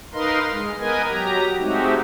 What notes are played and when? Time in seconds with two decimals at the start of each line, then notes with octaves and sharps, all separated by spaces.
0.13 D#4 A#4 B4 D#5 F5 C6
0.50 G#3
0.79 B3 A#4 B4 D#5 G#5
1.09 F#3 G4 A#5
1.59 G#3 A3 C4 D#4 F#4 G4